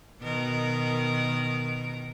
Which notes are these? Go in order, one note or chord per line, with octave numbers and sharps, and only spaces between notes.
B2 D#3 A#4